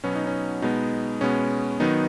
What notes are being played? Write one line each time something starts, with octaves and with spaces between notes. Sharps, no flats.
B2 F#3 B3 C#4
D#4
C#4
B2 G#3 B3 D#4
B2 G#3 B3 C#4
D#3 F#3 B3 D#4